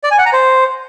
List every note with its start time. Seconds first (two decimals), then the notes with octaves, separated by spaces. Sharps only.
0.04 D5
0.11 G#5
0.18 F#5
0.26 A#5
0.33 C5